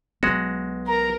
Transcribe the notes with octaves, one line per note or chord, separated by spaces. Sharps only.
B1 F#3 G#3 B3 F#4
A#4 A#5